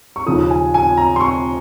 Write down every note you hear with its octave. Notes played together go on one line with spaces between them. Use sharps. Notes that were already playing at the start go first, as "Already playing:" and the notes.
C#6
D#2 C#3 F3 D#6
G#5
G#5
A#5
C6
C#6